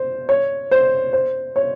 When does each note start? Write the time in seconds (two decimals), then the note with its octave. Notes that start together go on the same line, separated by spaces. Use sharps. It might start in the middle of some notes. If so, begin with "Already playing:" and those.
Already playing: C5
0.29 C#5
0.71 C5
1.13 C5
1.56 C#5